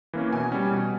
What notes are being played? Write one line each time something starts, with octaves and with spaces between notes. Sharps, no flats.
E3 A#3 C#4
B2 G#5
G3 C#4
B2